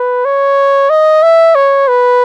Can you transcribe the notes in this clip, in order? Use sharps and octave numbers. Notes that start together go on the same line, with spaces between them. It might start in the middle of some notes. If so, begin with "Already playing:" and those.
Already playing: B4
C#5
D#5
E5
C#5
B4